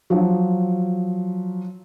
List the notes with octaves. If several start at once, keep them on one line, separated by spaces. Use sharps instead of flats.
F3 F#3